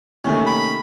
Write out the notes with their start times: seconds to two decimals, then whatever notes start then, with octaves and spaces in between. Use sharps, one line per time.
0.24 C3 D#3 A3 A#3 C#4
0.46 B5